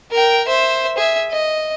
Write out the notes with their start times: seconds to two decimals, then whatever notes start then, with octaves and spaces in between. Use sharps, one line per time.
0.12 A#4 G5
0.48 C5 E5
0.98 G#4 E5
1.31 D#5